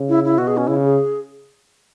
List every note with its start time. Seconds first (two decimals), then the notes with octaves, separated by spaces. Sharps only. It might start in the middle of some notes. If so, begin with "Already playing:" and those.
Already playing: C#3
0.09 E4
0.24 E4
0.38 B2 F#4
0.47 G#4
0.57 C#4
0.67 C#3 E4
0.85 G#4